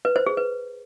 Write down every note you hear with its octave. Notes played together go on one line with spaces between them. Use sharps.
B4
C5
G#4
B4